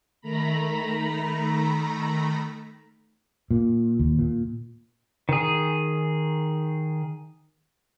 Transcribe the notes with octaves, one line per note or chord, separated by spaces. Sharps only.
D#3 A3 A#5 B5
A#2
D#2
A#2
D#3 G#4